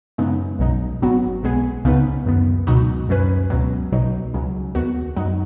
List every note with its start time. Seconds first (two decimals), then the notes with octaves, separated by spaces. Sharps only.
0.18 F#2 C#3 G#3 B3 D#4
0.59 B1 B2 F#3 D#4
1.01 G#1 G#2 F#3 B3 F#4
1.43 B1 B2 G#3 B3 G#4
1.85 C#2 C#3 B3 D#4 B4
2.26 F#2 D#3 B3
2.67 C#2 B2 F#3 D#4 F#4
3.09 F#2 F#3 C#4 B4
3.50 C#2 B2 F#3
3.92 B1 B2 F#3 D#4
4.34 C#2 C#3 F#3
4.75 D#2 D#3 B3 F#4
5.16 F#2 F#3 D#4 F#4